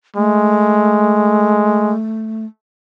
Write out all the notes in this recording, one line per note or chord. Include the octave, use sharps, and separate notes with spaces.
G#3 A3